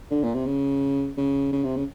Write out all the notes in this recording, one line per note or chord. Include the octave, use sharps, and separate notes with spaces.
D3
A#2
C3
C#3
C#3
C#3
C3
C#3